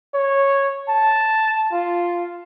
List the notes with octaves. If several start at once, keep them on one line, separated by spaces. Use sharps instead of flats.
C#5
A5
F4